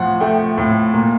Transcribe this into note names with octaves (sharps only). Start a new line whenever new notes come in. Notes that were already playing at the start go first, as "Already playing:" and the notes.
Already playing: A2 F3 F#5
A3 G5
A2
A#2